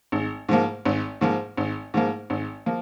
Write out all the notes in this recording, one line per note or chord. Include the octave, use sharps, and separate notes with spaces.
G#1
G#2 F3 A#3
G#1
G#2 F3 A#3
G#1
G#2 F3 A#3
G#1
F3 A#3